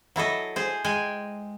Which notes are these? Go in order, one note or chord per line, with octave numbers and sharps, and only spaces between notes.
F#3 E4 A4 D#5
G#4 C5
G#3 G5 G#5